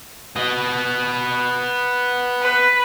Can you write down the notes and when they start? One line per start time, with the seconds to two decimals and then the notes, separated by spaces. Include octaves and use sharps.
0.36 B3 D#5
2.42 B4